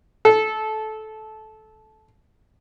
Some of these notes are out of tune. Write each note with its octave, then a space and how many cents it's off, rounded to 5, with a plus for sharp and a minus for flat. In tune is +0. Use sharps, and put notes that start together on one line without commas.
A4 -20